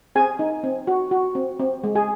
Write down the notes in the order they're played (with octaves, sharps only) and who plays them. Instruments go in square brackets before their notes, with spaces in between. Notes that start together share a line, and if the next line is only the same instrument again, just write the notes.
[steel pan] C4 G#4 G#5
D#4
C4
F#4
F#4
C4
C4
G#3
G#4 G#5